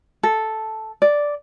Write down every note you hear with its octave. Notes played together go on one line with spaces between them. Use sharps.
A4
D5